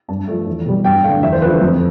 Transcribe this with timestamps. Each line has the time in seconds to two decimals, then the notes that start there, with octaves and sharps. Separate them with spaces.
0.08 G2 A5
0.28 F3 A3
0.46 E2
0.66 B2 G3
0.84 G2 G5
1.04 D3 A3 F5
1.23 E2 E5
1.32 C5
1.42 D3 F3 A3 B4
1.52 A4
1.61 F2